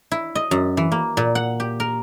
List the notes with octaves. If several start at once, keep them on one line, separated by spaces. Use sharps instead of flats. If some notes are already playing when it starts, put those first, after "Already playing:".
E4
D#5
F#2
E3
A#3
A#2
F#5
G4
A#4